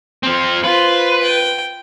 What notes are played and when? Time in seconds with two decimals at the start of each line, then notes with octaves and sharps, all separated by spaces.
0.23 F3 C4
0.64 F4 B4 C5
1.23 G5